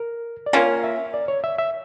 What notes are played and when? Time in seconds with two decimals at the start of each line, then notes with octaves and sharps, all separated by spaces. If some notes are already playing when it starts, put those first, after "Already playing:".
Already playing: A#4
0.46 D5
0.53 A#3 C#4 F4 A#4 C#5
0.84 E5
1.14 D5
1.28 C#5
1.44 E5
1.58 E5